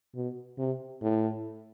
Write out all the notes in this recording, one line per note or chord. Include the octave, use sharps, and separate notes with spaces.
B2
C3
A2